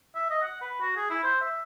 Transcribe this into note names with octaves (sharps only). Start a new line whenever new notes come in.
E5
D#5
F#5
B4
F#4
G#4
E4
C5
E5